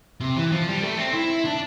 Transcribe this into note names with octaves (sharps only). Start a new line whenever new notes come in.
C3
E3
F3
G3
A3
C4
E4
D4